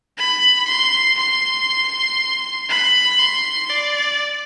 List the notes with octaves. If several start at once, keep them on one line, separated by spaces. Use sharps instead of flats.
B5
C6
C6
B5
C6
D5